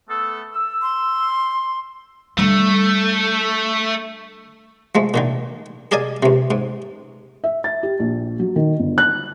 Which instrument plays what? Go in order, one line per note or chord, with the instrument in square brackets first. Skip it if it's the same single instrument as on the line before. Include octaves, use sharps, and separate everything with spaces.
[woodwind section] A3 B3 A4
E6
[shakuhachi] C6
[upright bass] D3 G3 [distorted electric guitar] A3
[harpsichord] F3 G#3 A3
A#2 D3 D#3
G#4 A#4 D5 D#5 G#5
C#2 C3
G#2
[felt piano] E5
A6
G4
A#1
F#3
D#3
G1
F#6